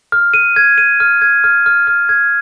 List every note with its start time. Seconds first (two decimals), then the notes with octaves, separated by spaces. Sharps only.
0.12 F6
0.34 D#7
0.56 G#6
0.78 D#7
1.00 F6
1.22 G#6
1.44 F6
1.66 F6
1.87 F6
2.09 G#6